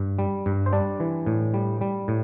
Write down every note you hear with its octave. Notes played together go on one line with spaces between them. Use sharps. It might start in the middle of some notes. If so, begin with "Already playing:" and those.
Already playing: G2
G3
G2
C5
G3 D4 D5
E3
A2
G3
G3
A2